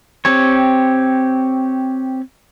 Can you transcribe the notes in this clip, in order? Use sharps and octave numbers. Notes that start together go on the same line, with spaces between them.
C4 G4 C#5